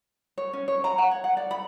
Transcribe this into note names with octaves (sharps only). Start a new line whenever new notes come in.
C#5
C#4
C#5
A#5
F#5
C#5
F#5
D5
B5